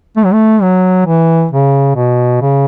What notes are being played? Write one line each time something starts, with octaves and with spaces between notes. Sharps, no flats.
A3
F#3
A3
F#3
E3
C#3
B2
C#3